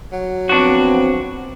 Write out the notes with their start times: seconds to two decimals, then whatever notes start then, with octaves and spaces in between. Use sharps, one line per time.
0.13 F#3
0.49 F3 B3 C4 D4 F#4